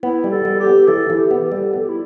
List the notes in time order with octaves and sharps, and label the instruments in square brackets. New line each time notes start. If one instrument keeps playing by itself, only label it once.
[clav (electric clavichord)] B3 [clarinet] E4
[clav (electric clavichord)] G3
[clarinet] A4
[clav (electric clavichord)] G3
[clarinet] G4
[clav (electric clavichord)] B3
[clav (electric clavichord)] E3 [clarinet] A4
[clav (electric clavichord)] E3
[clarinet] G4
[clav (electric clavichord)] B3 [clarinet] G4
[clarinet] A4
[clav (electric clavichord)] G3
[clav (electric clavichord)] B3 [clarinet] A4
[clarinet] G4
E4